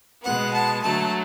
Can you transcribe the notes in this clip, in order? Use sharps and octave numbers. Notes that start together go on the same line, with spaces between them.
B2 G#3 B3 F#5
A5
D3 F#3 A3 A5